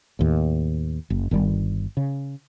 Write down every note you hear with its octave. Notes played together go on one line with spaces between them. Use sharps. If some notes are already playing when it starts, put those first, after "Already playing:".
D#2 A2
F#1
G1 D#3 G3
C#3